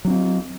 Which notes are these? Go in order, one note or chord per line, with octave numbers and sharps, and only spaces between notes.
F#3 C4 D4